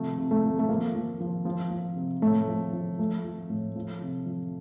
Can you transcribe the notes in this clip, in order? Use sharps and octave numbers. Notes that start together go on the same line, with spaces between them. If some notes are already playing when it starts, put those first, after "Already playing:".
Already playing: C3 F3 A3
C3
A3
F3
A3
F3 A#3
F3
F3
F3
F3
C3
A2 A3
F3
F3
F3 A3
F3
A2
F3
C3
F3